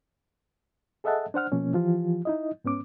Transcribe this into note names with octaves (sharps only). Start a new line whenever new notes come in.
G#4 A4 D#5 E5 F#5 A5
D4 C5 F#5 F6
B2 F3 A#3 C#4
E3 F3 F4 G4
D#4 E4 D#5
G#2 B3 C#4 D6